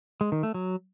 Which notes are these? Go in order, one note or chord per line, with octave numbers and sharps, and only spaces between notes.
G#3
D#3
A3
F#3